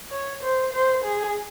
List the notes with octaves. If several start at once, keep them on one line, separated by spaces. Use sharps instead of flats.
C#5
C5
C5
G#4